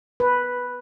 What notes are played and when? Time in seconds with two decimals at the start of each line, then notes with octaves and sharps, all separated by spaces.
0.20 B4